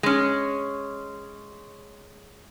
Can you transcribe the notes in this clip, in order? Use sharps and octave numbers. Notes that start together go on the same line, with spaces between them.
G#3 C#4